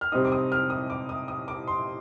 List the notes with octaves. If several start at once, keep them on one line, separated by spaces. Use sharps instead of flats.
F6
C3 G3 C4 D#4 D#6
D6
D#6
F6
D#6
D6
D#6
D#6
D6
C6